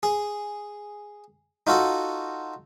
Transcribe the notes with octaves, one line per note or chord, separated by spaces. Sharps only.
G#4
D#4 F4 F#4 A4